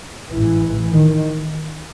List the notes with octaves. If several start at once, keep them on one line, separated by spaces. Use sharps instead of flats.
A1 G#2 E3
D#3